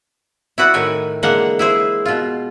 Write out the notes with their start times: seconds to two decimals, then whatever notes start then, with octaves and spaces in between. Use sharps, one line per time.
0.58 E4 F#4 B4 D5 F#5
0.74 A2 D#3 G5 G#5
1.23 D3 E3 G#3 A#3 F#5
1.59 E4 G#4 C5
2.06 B2 F4